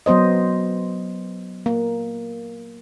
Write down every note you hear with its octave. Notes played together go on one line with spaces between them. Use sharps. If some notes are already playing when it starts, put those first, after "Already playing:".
F#3 B3 C5 D#5
A#3